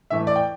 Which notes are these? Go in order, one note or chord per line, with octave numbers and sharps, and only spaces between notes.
A2 E3 A3 E5
D5
G5